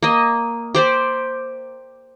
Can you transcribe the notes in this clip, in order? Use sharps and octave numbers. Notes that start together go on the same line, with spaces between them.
A#3 D#5
G4 C5 D5